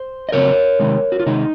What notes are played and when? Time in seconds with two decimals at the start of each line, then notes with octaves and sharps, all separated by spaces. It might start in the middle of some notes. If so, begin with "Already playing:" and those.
Already playing: C5
0.29 D#5
0.32 C#3 F#3 C4 A#4 C#5
0.79 C3 D#3 G#3
1.12 F#4
1.20 F4
1.26 C3 D#3 G#3 D#4